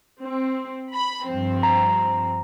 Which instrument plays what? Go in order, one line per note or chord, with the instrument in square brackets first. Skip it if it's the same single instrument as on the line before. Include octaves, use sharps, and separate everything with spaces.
[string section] C4
B5
G2 F3 C4
[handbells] A#5